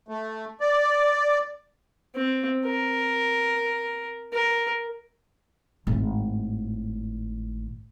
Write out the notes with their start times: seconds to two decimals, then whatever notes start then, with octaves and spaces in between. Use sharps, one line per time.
0.08 A3
0.60 D5
2.15 C4
2.66 A#4
4.33 A#4
5.87 G#1 A2